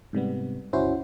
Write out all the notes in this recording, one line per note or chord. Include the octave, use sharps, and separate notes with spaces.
G#2 C3 G3 B3
G1 C#2 C#4 E4 F#4 C5